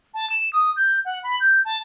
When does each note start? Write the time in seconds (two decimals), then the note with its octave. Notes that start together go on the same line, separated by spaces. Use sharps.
0.14 A5
0.30 E7
0.53 D#6
0.76 G6
1.05 F#5
1.24 B5
1.40 G6
1.65 A5